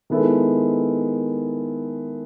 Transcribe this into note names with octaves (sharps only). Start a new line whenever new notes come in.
D#3 G#3 B3 E4 A4